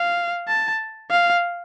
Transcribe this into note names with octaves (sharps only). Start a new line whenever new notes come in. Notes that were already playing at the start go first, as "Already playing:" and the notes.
Already playing: F5
A5
F5